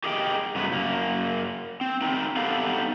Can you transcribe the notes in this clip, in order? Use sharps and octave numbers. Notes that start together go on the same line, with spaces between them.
G4 G#4 A#4 D#5 G5
G2 C#3 F#3 A3 B3 B4
F#2 A#3
C4
C4 D#4 A#4
B3 D#4 G4 A4 B4 F5